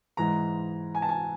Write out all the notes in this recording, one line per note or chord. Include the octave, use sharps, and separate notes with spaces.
G#2 E3 G#3 A#5
G#5
A5
G#5